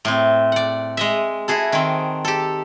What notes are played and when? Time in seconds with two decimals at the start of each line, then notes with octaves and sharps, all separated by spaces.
0.05 A2 C4
0.52 D5 F#5
0.97 G#3 D#5 E5
1.48 E4 F#4 G#4 A4
1.72 D#3 C4
2.25 G4 A4